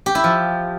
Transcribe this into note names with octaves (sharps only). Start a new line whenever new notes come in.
G4
E4
F3